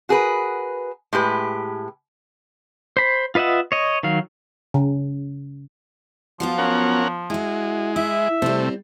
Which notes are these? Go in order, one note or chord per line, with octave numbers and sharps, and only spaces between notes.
F#4 G#4 A#4 B4
A2 G#3 G4 B4
C5 B5
F4 B4 D#5 E5 F#5
C#5 D#5
D#3 F#3 F5
C#3
F3 F#3 B3 F4
C#4 A#4 F#5
G#3 E4 F#4
E4 E5
C3 G3 A3 C4